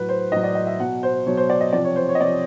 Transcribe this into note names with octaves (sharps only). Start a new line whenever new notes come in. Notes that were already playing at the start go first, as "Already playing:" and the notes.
Already playing: A2 F#3 B4
C5
A2 F#3 D#5
D5
D#5
E5
B2 F#3 F#5
C5
B2 F#3 C#5
C5
D5
D#5
C3 F3 D5
C#5
C5
C#5
D#5
C3 F3 D5